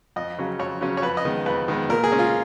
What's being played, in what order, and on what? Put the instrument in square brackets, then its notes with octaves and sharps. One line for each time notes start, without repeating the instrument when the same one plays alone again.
[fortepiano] F2 D#5
C#3 F#3 C#4
F2 C#5
C#3 F#3 C#4
C#5
F2 B4
D#5
D#3 G#3 B3
F2 B4
D#3 G#3 B3
A#2 A#4
G#4
G#3 C#4
F4